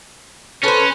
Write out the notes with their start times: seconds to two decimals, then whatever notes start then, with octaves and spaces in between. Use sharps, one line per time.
0.64 C#4 A4 B4 C5